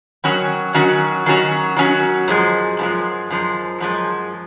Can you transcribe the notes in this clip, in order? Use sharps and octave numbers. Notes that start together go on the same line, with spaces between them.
D#3 F#3 C#4 F#4
D#3 F#3 C#4 F#4
D#3 F#3 C#4 F#4
D#3 F#3 C#4 F#4
F#2 F3 G#3
F#2 F3 G#3
F#2 F3 G#3
F#2 F3 G#3